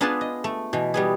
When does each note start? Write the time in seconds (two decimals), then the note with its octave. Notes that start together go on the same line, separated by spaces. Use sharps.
0.01 B3 D4 F4 G#4 B4 A5
0.21 D#5
0.44 A3
0.73 B2 E3
0.94 G3 B3 G#4